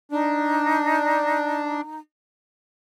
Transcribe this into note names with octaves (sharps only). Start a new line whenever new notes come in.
D4 D#4